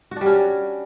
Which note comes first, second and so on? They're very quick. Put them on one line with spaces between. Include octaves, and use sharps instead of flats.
F#4 D4 G3 C#4